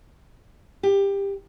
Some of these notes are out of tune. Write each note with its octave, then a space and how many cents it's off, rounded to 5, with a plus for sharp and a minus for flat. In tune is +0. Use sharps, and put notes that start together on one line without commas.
G4 +20